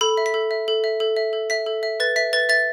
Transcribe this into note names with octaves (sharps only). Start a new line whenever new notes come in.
A4 B5
E5
B6
A4
E5
A4
E5
A4
E5
A4
E5 B6
A4
E5
B4 A6
E5 B6
B4 A6
E5 A6